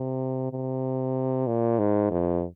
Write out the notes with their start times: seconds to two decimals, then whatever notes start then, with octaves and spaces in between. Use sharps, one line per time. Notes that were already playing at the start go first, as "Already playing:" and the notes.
Already playing: C3
0.51 C3
1.47 A#2
1.79 G#2
2.11 F2